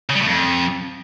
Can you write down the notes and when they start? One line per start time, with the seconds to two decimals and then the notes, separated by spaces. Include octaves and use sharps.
0.09 C#3
0.15 G3
0.20 A2
0.26 F2